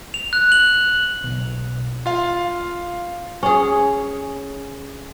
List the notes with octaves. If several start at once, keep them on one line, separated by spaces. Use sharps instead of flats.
F7
F#6
F#7
B1
F4 F5
C#4 G#4